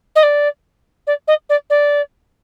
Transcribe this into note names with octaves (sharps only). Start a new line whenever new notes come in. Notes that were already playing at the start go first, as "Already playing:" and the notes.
D#5
D5
D5
D#5
D5
D5